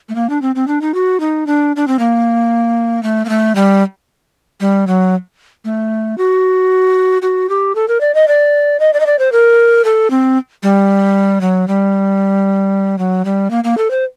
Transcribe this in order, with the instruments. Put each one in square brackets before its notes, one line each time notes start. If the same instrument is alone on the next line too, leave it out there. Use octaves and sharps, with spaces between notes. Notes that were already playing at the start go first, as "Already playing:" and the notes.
[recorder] A3
A#3
D4
C4
C4
D4
D#4
F#4
D#4
D4
D4
C4
A#3
A3
A#3
A3
G3
G3
F#3
A3
F#4
F#4
G4
A4
A#4
D5
D#5
D5
D#5
D5
D#5
D5
C5
A#4
A4
C4
G3
F#3
G3
F#3
G3
A#3
A#3
A4
C5